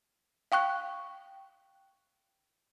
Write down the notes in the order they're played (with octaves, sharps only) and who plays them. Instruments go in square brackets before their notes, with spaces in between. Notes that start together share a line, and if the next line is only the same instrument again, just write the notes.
[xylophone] F5 G5 C#6 F#6